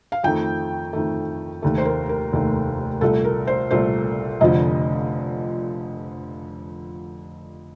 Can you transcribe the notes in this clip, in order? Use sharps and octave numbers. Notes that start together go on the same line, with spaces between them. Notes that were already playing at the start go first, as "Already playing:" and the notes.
F5
F2 D#3 A3 G5
F2 D#3 A3
F1 D#2 D#3 A3
C5
A#4
A#4
F1 D#2 D#3 A3
C2 A#2 A3 A4
A#4
C5
C2 A#2 A3 C5
F1 F2 D3 F3 D#5